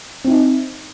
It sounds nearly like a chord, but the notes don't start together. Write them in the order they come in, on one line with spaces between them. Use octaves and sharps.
C4 E4 D#4